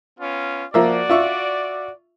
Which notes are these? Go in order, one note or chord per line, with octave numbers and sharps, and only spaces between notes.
B3 C#4 F4
F3 A#3 F#4 D5 E5
F4 E5 C#6